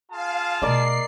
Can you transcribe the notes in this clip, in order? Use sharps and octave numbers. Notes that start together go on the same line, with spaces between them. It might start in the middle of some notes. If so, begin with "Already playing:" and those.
F4 G#4 F5 A5
B2 A3 A#4 D5 D#5 C7